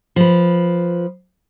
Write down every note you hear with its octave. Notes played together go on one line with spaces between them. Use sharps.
F3 B4